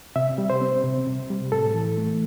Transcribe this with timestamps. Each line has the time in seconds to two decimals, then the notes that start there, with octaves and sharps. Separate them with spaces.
0.16 C3 E5
0.38 G3
0.50 C5
0.61 C4
0.84 C3
1.07 C3
1.30 G3
1.52 A2 A4
1.75 E3
1.97 A3